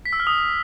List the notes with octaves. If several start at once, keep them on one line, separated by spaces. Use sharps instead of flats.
B6
E6
F6
D#6